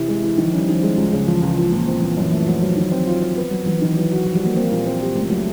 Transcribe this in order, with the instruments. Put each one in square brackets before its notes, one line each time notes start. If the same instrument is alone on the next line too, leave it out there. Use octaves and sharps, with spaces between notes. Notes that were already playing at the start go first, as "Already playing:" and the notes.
Already playing: [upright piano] C3 E3
G#3
E3
[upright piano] D#3 [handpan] F3
[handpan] F3
[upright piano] C#4
[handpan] G3
[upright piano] D#3 [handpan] F3
[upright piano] G#3
C#2
C#3
[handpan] E3 [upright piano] F3
[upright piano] C#2
F3
A#2
[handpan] F3 [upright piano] C4
[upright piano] A#2 [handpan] E3
[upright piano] F#2
[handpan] E3
[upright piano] A3
[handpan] F3 [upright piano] F#3
[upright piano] F#3
D#3
C4
F4
C4
B3
F#3
[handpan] E3 [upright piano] F#3
[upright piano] D#3 [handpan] E3
[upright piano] F#3
F#4
[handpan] F3 [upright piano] F#4
[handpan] G3
[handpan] A#3 [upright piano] F#4
[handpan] A#3 [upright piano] C4
[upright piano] A#2
C4
G3
[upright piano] C#2 [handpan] A3
[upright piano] F#3 [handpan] A3